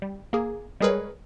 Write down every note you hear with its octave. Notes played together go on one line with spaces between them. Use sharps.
G3
A#3 G#4
G3 G#3 G#4 A#4 B4 C#5